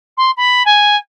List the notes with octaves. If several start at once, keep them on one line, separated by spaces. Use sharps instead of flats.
C6
B5
G#5